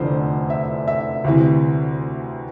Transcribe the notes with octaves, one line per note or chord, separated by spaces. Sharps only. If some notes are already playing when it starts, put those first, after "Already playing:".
Already playing: F1 E2 D3 F3 C5
E5
E5
D2 C3 E3